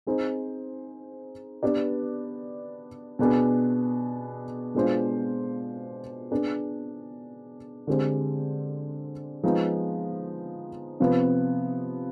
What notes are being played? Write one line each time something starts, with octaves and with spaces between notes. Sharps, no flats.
C4 D#4 G#4 C5
B3 D4 G4 B4 D5
B2 B3 D4 G#4
B2 G#3 D4 F4 C5
B3 D4 G#4
D3 G#3 C4 G4 C5
F3 G#3 B3 D#4
C3 F3 B3